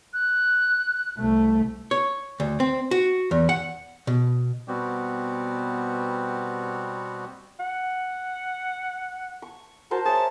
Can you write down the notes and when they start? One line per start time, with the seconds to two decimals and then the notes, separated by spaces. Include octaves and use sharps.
0.14 F#6
1.19 C2 A3
1.91 C#5
2.40 D2
2.60 C4
2.91 F#4
3.31 E2
3.49 F#5
4.07 B2
4.68 B2 G3 B3 C4 F#4 G4
7.60 F#5
9.42 C#6
9.91 F#4 A#4 C5 A5
10.05 G#4 C#5 E5 A5